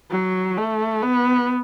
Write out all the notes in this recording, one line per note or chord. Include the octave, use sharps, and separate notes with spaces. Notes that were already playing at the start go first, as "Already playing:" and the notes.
F#3
A3
B3